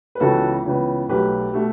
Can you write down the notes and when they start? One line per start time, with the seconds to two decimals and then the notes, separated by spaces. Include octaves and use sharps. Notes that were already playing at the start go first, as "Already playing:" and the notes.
0.15 B4
0.20 C#2 C#3 E3 B3 F#4 A4
0.65 C#2 C#3 E3 B3
1.09 B1 B2 A3 G4 B4
1.54 B2 A3